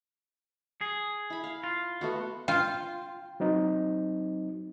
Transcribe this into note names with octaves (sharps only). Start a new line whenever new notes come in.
G#4
E4 B5
F5
F4
A3 B3 F#4
F4 G5
F#3 C4 D#4